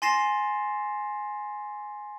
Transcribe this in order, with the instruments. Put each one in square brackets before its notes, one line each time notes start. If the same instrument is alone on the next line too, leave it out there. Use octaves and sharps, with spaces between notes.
[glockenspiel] G#5 C6 A6 A#6 C7 E7